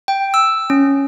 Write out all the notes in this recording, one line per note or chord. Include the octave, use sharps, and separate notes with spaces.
G5
E6
C#4